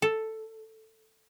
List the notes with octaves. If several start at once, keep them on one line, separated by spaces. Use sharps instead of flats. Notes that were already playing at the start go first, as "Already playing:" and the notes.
A4